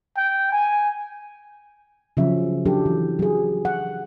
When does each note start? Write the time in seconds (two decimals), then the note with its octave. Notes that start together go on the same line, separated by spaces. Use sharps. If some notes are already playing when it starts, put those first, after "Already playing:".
0.17 G5
0.52 G#5
2.17 C#3 F3 F#3 C#4 E5
2.66 F#3 D4 G4 A4
2.86 E3
3.19 F#3 G#4
3.65 F#5